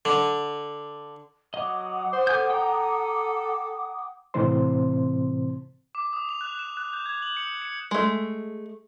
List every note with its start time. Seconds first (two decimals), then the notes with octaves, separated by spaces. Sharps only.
0.05 D3
1.54 F#3 D#5 F#5 D6 D#6
2.13 C5
2.27 A4 G#5 G6
2.50 A4 G5 A#5
4.34 A2 C3 E3 C4 C5 C6
5.95 D6
6.13 D#6
6.29 F7
6.41 F#6
6.59 E7
6.77 F#6
6.93 G6
7.06 G#6
7.22 F#7
7.37 C#7
7.62 C#7
7.91 G#3 A3